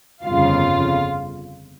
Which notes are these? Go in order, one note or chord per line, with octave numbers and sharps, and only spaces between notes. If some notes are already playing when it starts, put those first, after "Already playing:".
G1 F2 C#3 F4 F5